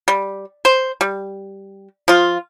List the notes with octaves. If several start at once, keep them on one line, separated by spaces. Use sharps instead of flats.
G3
C5
G3
F3 F4